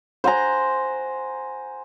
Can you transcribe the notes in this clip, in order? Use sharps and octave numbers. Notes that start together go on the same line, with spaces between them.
C5 F#5 G#5 A#5